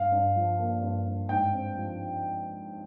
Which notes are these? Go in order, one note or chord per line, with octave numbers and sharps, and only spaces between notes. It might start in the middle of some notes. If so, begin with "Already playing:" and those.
Already playing: G2 F5
G2
F3
A#3
G2
G2
G#2 G5
C4
F3